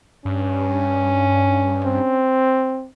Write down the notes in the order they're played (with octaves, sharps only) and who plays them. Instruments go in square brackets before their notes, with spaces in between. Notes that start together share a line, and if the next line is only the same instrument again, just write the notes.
[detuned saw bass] G2 [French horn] C#4
[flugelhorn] C4